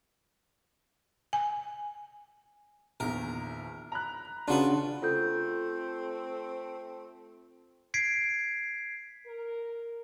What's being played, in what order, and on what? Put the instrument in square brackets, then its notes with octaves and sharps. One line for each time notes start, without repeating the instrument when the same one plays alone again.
[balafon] G#5
[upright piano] A#1 E2 D#3 [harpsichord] A#4
[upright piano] A#5 B5 F#6
[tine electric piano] C#3 D4 [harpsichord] F4 F#4 B4
[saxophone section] A3 C4 [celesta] F4 A4 G6
[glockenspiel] G#6 B6 C7 D7
[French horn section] A#4